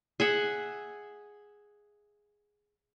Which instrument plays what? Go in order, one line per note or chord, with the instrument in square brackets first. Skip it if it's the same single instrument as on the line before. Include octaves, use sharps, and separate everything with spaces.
[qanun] G#4 E5 F#5